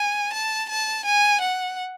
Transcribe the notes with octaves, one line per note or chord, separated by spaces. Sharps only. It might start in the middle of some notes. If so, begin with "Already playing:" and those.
Already playing: G#5
A5
A5
G#5
F#5